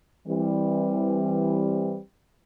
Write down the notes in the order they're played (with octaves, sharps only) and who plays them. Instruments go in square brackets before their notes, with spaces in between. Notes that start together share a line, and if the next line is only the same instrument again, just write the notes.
[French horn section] E3 G3 C4